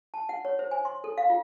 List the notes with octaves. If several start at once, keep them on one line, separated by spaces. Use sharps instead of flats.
A5
F#5
C#5
C5
G#5
C6
A4
F5
F4